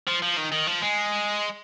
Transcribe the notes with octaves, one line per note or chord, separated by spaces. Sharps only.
F3
F3
D#3
D#3
F3
G#3